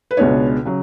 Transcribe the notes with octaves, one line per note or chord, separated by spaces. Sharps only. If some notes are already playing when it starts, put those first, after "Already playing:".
B4
C#2 B2 G#3 B3 D4 C#5
C#3 F#3